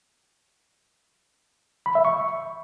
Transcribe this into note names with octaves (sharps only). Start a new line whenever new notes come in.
B5
E5
C#6